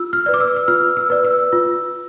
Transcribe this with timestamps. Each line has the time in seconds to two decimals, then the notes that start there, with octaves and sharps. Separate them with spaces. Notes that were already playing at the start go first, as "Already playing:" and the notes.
Already playing: F4 E6
0.13 F6
0.26 B4 D5
0.34 D6
0.40 E6
0.57 E6
0.68 F4 F6
0.97 E6
1.10 B4 D5
1.24 E6
1.53 F4